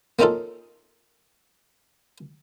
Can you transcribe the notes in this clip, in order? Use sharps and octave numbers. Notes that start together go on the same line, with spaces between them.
A#3 C4 C#4 D#4 F4 A4